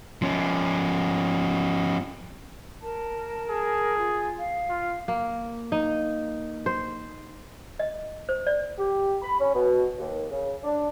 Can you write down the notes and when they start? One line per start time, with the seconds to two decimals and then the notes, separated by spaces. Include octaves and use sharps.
0.22 F3 C#4
2.81 A#4 A5
3.50 G#4
3.98 F4
4.39 F5
4.70 F4
5.08 A#3
5.72 D#4
6.66 C5
7.79 D#5
8.29 C5
8.47 D5
8.78 G4
9.22 B5
9.40 C#4
9.54 B2
9.99 D#2
10.31 C#3
10.64 D4